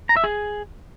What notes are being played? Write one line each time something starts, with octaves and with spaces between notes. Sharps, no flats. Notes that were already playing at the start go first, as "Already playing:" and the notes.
A#5
E5
G#4